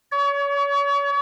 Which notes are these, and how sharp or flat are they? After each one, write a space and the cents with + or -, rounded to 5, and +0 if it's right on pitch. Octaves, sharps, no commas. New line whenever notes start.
C#5 +35